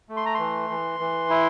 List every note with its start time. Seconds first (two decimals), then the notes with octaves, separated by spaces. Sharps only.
0.09 A3
0.17 C6
0.26 A#5
0.34 E3 C6
0.70 E3
1.00 E3
1.30 E4